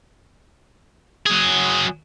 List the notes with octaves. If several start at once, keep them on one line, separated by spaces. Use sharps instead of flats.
F#3 G#4